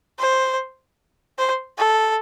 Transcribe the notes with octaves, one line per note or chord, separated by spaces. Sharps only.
C5
C5
A4